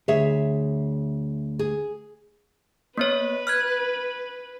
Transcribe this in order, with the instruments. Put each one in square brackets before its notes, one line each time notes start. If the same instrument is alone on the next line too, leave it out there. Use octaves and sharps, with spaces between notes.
[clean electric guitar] D2 [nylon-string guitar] G#4 C#5 E5
[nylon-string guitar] G#4
[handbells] A#3 B3 C#5 [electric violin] B4
[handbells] F6 F#6 G#6